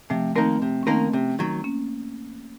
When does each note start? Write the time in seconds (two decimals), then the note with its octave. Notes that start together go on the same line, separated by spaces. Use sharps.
0.10 C3 F3 A3
0.36 D#3 A3 A#3 C4 D#4 A#4
0.62 C3
0.83 C#4
0.87 D#3 A3 A#3 C4 D#4 A#4
1.13 C3
1.39 D#3 F#3
1.64 A#3 C#4